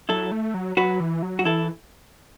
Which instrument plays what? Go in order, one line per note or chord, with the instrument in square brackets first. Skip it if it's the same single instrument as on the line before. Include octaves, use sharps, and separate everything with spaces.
[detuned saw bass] F#3 [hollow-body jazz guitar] E4 A4
[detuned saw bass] A3
F#3
[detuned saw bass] F#3 [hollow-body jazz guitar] F#4 B4
[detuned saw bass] E3
F#3
[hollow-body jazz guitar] F#4
[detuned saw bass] E3 [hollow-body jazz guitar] E4 A4